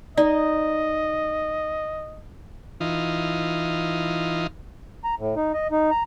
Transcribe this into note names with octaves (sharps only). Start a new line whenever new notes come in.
D#4 D5 D#5
E3 D#4 F4
A#5
A2
D#4
D#5
D#4
A#5